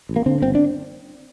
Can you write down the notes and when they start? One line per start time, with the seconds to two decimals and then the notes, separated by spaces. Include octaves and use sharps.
0.09 A1
0.16 A#3
0.26 D3 C4
0.42 G1 C4
0.55 D4